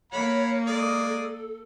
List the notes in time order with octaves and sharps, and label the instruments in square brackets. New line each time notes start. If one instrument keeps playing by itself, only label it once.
[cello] A#3 [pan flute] C#5 [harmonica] F#5 B5
[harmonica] G#3 D5 D#6 [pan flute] A4